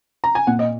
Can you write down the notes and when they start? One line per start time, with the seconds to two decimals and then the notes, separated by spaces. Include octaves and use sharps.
0.24 A#5
0.35 G#5
0.47 A#2 F#5
0.59 D#5